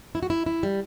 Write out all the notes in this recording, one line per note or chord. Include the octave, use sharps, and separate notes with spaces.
E4
F#4
E4
E4
G3